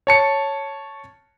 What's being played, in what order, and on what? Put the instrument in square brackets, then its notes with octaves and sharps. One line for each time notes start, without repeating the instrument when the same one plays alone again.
[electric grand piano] C#5 A5 C#7